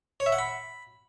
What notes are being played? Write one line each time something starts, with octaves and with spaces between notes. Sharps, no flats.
C#5
E5
F#5
B5